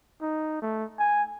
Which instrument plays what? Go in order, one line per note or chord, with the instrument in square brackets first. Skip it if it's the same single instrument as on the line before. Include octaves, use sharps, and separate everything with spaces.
[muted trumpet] D#4
A3
G#5